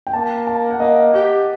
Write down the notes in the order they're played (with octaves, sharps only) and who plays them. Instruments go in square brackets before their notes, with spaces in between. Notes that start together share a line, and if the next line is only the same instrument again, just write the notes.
[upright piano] G5
[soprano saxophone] A#3 [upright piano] A5
[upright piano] A5
F#5
[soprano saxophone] A#3 [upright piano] D#5
[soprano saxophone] G4 [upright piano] F#5